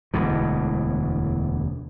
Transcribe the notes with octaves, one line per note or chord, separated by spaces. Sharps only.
E1 D2 B2 E3